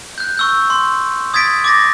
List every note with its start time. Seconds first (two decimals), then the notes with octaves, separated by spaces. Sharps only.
0.18 F#6 G6
0.37 C#6 E6 G6
0.70 C6
1.34 D#6 G#6 A6 B6 D7
1.64 D6 A6 A#6